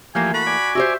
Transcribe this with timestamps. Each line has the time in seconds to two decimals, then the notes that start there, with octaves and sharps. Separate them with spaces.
0.15 E3 F3 A3 A#3 G4 G#5
0.34 F#4 A4 B5
0.47 D5 G#5
0.75 F#4 G4 C5 E5